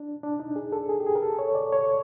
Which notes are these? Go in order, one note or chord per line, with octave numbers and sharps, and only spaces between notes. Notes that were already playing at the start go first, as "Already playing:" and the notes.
Already playing: D4
D4
D#4
G#4
A4
G#4
G4
G#4
A#4
A4
C#5
D5
C#5